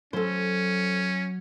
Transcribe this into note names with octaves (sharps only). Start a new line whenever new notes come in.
F#3 C#4 A4 C5